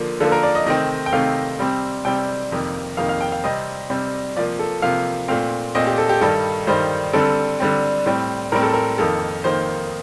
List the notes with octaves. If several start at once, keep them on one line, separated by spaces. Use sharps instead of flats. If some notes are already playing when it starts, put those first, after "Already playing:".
Already playing: D3 F3 A#3
D3 F3 A#3 A4
A#4
D5
D#5
C3 D#3 A3 C4 D#5
G5
C3 D#3 A3 C4 F5
C3 G3 C4
C3 G3 C4 G5
F2 C3 D#3 A#3
F2 C3 D#3 A#3 F5
F5
G5
F5
C3 G3 C4 D#5
C3 G3 C4
C3 F3 A#3 D5
A4
C3 F3 A#3 F5
A#2 A3 C4 F5
A#2 A3 C4 D#5
G4
A4
G4
G2 D#3 G3 A4
G2 D#3 G3 C5
D3 G3 C4 A4
D3 G3 C4
A2 G3 C4
A2 G3 C4 A#4
A4
A#4
F2 D#3 A#3 A4
F2 D#3 A#3 C5